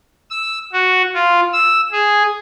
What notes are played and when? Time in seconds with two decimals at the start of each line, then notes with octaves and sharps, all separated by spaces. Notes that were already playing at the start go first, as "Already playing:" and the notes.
0.31 E6
0.73 F#4
1.14 F4
1.53 E6
1.92 G#4